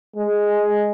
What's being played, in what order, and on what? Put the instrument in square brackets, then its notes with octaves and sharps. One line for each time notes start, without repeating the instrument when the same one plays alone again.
[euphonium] G#3